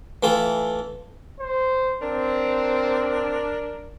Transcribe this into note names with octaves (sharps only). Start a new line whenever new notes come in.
E3 A3 F4 G5
C5
C4 D4 A#4